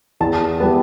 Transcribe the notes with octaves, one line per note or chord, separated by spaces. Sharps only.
E2 A5
E3 G3 B3